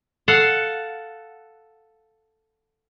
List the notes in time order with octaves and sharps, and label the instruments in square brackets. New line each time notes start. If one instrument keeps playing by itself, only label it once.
[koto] A4 F5 F#5